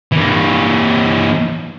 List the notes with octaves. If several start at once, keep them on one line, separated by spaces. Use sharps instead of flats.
E3 A#3